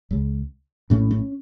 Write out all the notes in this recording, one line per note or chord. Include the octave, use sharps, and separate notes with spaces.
C#2 C#3
A#1 A2 C#4
C#4